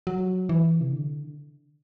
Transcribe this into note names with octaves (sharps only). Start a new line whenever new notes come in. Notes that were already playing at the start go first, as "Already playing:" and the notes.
F#3
E3
C3
D3